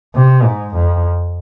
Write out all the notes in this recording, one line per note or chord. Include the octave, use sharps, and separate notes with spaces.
C3
G#2
F2